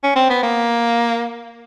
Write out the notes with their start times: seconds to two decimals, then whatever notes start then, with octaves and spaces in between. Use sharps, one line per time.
0.04 C#4
0.16 C4
0.30 B3
0.43 A#3